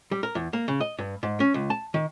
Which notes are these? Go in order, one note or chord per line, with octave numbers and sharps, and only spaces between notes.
G3
A#4
E2
A#3
C#3
D#5
G2
G#2
C#4
C#2
A5
D#3